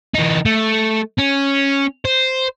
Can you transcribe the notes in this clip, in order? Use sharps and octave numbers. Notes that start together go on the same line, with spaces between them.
E3 D#4
A3
C#4
C5